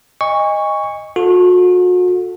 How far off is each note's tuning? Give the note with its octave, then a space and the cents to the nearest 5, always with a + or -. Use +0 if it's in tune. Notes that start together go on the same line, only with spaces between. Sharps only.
D#5 +0 G#5 -35 C#6 +5
F#4 -40 A4 +0